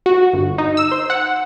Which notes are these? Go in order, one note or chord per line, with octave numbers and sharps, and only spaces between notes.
F#4
G1
D#4
E6
C5
F#5